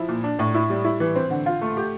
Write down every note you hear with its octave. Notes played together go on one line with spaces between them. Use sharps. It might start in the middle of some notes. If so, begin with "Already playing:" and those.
Already playing: F3 E4
A#2
D4
A2
E4
G3
E4
E3
C4
D3
F4
A3
G4